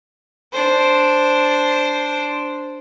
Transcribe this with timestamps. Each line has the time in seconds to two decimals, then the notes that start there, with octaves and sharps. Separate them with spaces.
0.53 D4 C5